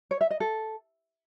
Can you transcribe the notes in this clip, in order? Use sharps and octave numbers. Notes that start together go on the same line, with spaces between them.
C#5
E5
D#5
A4